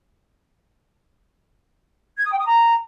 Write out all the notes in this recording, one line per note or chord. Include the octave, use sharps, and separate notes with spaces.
G#6
D#6
G5
D#6
A#5